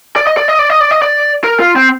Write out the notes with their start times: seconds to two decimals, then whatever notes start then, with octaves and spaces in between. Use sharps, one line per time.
0.16 D5
0.27 D#5
0.37 D5
0.48 D#5
0.59 D5
0.70 D#5
0.81 D5
0.91 D#5
1.02 D5
1.44 A#4
1.60 F4
1.76 C4